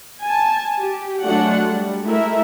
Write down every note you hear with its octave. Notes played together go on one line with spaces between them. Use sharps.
G#5 A5
G4
F#3 G#3 A3 D4 F#4 F#5
G3
G#3 A3 E4 A#4 E5